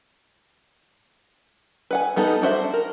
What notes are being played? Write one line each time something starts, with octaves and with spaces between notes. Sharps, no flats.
B4 F#5 G#5
G3 B3 D#4 A4
D4 F#4 C5 E5
A#4